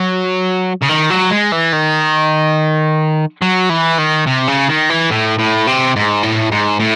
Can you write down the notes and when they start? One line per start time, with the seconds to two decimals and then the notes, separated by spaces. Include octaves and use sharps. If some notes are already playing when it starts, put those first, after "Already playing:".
Already playing: F#3
0.82 C#3
0.89 D#3
1.10 F#3
1.30 G#3
1.52 E3
1.73 D#3
3.42 F#3
3.70 E3
3.99 D#3
4.27 C3
4.48 C#3
4.69 D#3
4.90 E3
5.11 A2
5.39 A2
5.67 C3
5.96 G#2
6.23 A2
6.51 G#2
6.80 A2